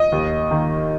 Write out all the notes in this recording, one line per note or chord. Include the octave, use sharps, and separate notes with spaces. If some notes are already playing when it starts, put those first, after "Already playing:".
Already playing: D#5
D#2
D#3 A#3